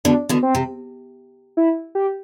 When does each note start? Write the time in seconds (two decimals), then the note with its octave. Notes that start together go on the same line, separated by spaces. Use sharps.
0.05 B2 D3 D4
0.29 B2 D3
0.43 C4
0.55 C3
1.57 E4
1.95 G4